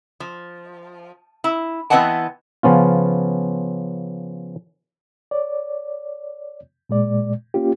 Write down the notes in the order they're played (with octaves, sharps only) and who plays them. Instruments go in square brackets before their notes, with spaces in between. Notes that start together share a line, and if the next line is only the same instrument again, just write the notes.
[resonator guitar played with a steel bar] F3
E4
E3 B3 C4 D#5 F#5 A5
[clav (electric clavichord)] C#3 F3 B3 C#4 F4
[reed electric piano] C#5 D5
A#2 G#3 D5
A#3 C#4 F4 G4